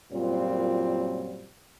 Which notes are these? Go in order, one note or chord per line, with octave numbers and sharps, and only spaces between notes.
F#2 A#2 F#3 G3 C4 F4